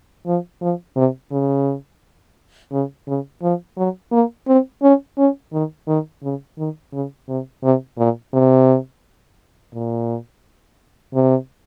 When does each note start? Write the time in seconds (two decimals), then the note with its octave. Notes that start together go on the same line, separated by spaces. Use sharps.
0.26 F3
0.62 F3
0.96 C3
1.32 C#3
2.72 C#3
3.07 C#3
3.42 F3
3.77 F#3
4.12 A#3
4.47 C4
4.83 C#4
5.18 C#4
5.53 D#3
5.87 D#3
6.23 C#3
6.58 D#3
6.93 C#3
7.29 C3
7.63 C3
7.98 A#2
8.33 C3
9.74 A#2
11.14 C3